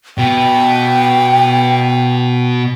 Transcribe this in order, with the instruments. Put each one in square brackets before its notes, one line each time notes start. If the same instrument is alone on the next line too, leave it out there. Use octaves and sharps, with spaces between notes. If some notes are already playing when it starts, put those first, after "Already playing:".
[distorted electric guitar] B2 [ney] G5